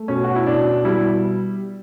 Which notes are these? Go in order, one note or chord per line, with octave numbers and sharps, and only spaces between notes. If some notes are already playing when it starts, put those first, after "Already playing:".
Already playing: A3
B2 C#4
F#4
E4
B2 D4
G3 E4